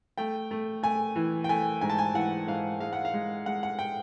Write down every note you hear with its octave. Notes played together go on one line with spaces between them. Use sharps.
A3 G5
A3
A3 G#5
E3
G5
A3 G#5
G#2 G#5
A5
G#5
E3 F#5
G#2 F5
G#3 F5
F#5
F5
G#3
G#3 F#5
F#5
G5